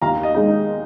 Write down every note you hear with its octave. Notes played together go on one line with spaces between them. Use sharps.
D#2 F5 A#5
D#5
G#3 D#4